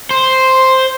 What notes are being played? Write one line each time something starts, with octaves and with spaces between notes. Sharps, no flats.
C5